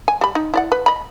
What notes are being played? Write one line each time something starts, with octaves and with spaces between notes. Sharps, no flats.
G#5
G3 B5
D#4
E4 D5 F#5
B4
D#5 B5